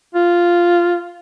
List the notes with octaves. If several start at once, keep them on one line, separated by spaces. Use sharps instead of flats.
F4